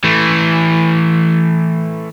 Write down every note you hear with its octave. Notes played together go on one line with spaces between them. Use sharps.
E3 A3